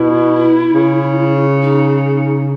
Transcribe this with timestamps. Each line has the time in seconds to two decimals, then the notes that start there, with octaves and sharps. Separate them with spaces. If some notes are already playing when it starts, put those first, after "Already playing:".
Already playing: B2 E4
0.73 C#3
1.62 D#4